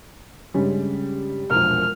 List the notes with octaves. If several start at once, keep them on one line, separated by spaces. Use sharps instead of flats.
G2 C#3 G3 G#3 C#4
E1 A#1 A#4 F6